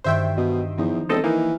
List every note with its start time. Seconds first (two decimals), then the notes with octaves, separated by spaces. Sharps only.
0.04 G2 D#3 F#4 C5 E5 G5
0.37 B2 D#5
0.77 E2 F3 D#4
1.09 E1 C4 A4 D#5
1.24 E3 A#3 D#4 F6